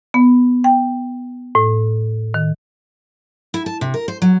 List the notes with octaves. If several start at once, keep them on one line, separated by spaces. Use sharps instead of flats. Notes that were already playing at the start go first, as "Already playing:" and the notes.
B3
G5
A2
D#3
E4
A5
C3
A#4
C5
F#3